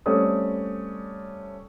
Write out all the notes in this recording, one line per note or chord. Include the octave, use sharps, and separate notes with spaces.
G3 A3 C4 C#4 D5 D#6